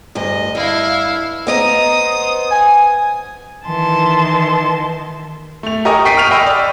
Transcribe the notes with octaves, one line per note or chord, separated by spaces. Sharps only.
D2 G2 D#5
G2 E4 F5
B3 C5 D#5 A#5 D#6
G#5
D#3 E3 A5 C6
A3 F7
G4 A#4 D#5 G#5 C#6 D#6
G5 C#6 B6 C7 D7 D#7
F6 D7 D#7 F7
D#5 G5 B5 C#6 D#6 E6
D5